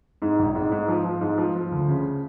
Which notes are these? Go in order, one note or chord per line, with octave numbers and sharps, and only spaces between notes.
G#2
A#1
G#2
G#2
F3
F3
G#2
F3
F3
D2
C#3